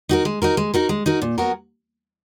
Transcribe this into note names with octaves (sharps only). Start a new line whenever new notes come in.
D#4 F#4 A#4
G#3
D#4 F#4 A#4
G#3
D#4 F#4 A#4
G#3
D#4 F#4 A#4
A#2
F#3 B3 F#4 A#4